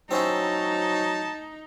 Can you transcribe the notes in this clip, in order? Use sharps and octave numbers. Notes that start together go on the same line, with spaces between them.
F#3 C4 C#4 D#4 E4 A5